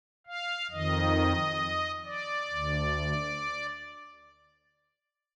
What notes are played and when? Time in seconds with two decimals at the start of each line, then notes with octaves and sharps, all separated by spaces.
0.27 F5
0.71 F2 D#3 D#5
2.05 D5
2.50 D2